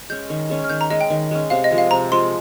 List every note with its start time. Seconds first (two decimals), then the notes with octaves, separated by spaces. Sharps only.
0.10 G#3 C#4 G6
0.30 D#3
0.50 G#3 C#4
0.64 F6
0.70 D#3 G6
0.81 A#5
0.90 G#3 C#4 D#5
1.01 G5
1.10 D#3
1.31 G#3 C#4
1.50 C3 F5
1.64 D#5
1.71 F3 G#3
1.78 F5
1.91 C3 A#5
2.12 F3 G#3 C6